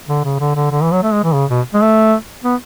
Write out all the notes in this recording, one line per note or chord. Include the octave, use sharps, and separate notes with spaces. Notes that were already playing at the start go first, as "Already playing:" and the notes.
D3
C#3
D3
D3
D3
E3
F#3
A3
G#3
E3
C#3
B2
G#3
A3
B3